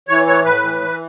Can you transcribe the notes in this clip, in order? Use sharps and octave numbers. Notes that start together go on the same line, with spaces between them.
E3 C#5
A2 C#5
A2 B4
E3
E3